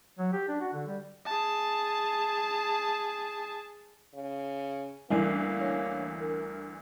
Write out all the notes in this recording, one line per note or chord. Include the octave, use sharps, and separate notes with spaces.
F#3
G4
D4
F#4
D3
G3
G#4 A5
C#3
D2 E3 G3 A#3 E4 A#4 G#5 C7
C#5
A#4